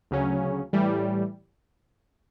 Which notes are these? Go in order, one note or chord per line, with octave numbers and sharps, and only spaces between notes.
D2 C#3 F#3 C#4
A2 E3 G3